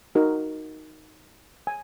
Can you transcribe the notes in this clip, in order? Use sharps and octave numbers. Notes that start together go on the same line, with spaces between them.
D#4 F#4 A#4
G#5